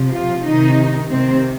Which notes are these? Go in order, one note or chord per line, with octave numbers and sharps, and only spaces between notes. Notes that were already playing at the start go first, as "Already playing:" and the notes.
Already playing: C3 F3
F4
C3 D#3 D#4
C3 D#3 C4